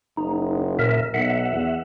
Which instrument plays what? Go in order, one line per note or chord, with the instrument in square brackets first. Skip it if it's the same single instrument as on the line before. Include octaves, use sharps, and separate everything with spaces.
[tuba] F#1 [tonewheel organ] D#4
[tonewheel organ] A#2 A#4 E5
[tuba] B1 [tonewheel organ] E5 F#5
[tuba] E2